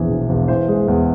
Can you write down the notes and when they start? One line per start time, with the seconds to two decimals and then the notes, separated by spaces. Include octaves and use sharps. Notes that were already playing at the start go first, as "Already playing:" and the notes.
Already playing: A#1 E2 E3 G#4
0.09 E1
0.29 E1
0.48 E3 C5
0.68 G#3
0.88 E2